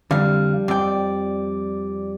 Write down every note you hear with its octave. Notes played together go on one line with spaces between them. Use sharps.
F2 D3 G3 F5
F2 D5 G5